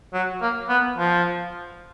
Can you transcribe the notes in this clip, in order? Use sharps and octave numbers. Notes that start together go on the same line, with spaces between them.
F#3
A#3
B3
F3